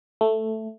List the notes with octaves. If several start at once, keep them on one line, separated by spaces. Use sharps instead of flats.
A3